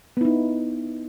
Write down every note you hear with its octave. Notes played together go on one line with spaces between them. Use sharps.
B3 D#4 E4